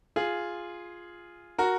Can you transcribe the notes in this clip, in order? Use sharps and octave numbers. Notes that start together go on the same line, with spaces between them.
F4 G#4
F#4 A#4